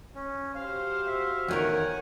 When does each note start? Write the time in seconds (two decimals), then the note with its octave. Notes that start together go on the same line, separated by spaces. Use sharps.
0.15 C#4
0.55 F#4 G4 C5 F5
1.07 E5 F5
1.48 E2 D#3 A#4 C#5 F#5 G#5